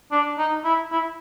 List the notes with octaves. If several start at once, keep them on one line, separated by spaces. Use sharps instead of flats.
D4
D#4
E4
E4